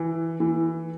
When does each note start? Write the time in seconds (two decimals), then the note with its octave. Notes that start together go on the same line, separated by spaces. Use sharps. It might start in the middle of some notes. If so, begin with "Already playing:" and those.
Already playing: E3
0.40 E3